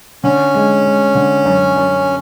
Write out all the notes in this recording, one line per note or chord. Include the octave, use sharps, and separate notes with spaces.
D3 C#4
G#3
G#3
D3
F#2
F#2